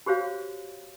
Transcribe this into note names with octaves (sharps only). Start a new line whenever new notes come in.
F#4 G4 C5 C#5 F5